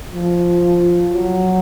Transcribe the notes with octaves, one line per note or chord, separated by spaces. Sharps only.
F3
F#3